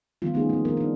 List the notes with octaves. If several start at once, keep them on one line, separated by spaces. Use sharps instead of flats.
D3 D#3 F3 G3 B3 F4
A3 B3 C#4 D#4 G#4
A#3 C4
D#3 F3 B3 D4 A#4
D4 D#4